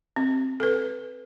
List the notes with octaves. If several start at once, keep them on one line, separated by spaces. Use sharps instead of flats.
C4
A4 B4